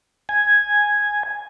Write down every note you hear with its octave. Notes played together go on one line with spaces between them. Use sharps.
G#5